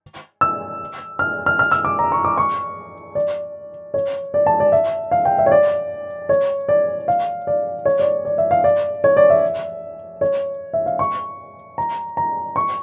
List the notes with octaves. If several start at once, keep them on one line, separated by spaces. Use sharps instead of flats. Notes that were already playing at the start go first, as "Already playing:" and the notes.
E6
F6
F6
F6
E6
D6
A#5
C#6
D6
C#6
D5
C#5
D5
A5
D5
E5
F5
G5
E5
C#5
D5
C#5
D5
F5
D5
C#5
D5
D5
E5
F5
D5
C#5
D5
E5
C#5
E5
F5
C#6
A#5
A#5
C#6